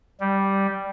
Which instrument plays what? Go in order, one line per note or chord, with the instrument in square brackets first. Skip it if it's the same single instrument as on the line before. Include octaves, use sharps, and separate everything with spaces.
[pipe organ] G3